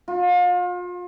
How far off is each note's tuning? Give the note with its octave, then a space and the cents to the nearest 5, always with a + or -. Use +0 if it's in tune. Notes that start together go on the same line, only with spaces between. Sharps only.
F4 +35